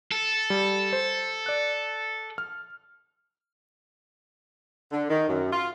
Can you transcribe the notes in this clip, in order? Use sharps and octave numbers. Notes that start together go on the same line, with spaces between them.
A4
G3
C5
D5 F#6
F6
D3
D#3
F#2
F4